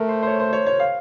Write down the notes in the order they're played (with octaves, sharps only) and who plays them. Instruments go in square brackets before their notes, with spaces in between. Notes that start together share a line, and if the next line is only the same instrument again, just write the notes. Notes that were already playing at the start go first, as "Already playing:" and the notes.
Already playing: [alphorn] A3 [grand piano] A#4
[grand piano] C5
C5
C#5
C5
C#5
C#5
F5